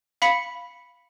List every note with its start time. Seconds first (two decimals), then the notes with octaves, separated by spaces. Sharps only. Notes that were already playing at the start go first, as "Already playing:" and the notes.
0.22 F5 B5 B6 C#7